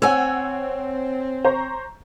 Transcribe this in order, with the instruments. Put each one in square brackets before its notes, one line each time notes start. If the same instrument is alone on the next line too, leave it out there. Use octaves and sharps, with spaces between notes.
[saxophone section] C4 [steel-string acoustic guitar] C#5 G#5 [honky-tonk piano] F#5 E6
[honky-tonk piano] C5 A#5 C#6